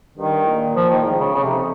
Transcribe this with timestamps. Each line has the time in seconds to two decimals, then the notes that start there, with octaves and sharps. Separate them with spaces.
0.18 G2 D#3
0.47 A#2
0.76 F3
0.91 D#3
1.05 G#2
1.20 C#3
1.34 F2 C#3
1.43 C3